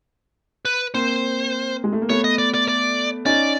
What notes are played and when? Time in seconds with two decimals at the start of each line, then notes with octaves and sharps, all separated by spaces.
0.65 B4
0.94 A#3 C4 C5
1.84 G#3
1.93 A3
2.02 A#3
2.09 A3 B3 C#5
2.24 D#5
2.38 D5
2.54 D5
2.68 D5
3.26 C#4 D#4 D5